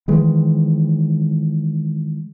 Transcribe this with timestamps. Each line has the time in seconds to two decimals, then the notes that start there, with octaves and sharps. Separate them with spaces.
0.08 D#3 E3 G#3